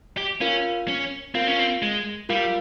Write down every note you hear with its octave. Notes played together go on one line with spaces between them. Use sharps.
G4
C#4 F4 A#4 F5
C#4
C4 F4 A#4 F5
C#4
C4
G#3
G3 F4 A#4 F5